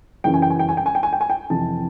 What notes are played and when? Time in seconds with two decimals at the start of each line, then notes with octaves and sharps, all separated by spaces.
0.24 F#2 C#3 E3 G5
0.34 G#5
0.42 G5
0.50 G#5
0.59 G5
0.69 G#5
0.77 G5
0.86 G#5
0.95 G5
1.03 G#5
1.13 G5
1.21 G#5
1.30 G5
1.50 F2 C3 E3 A5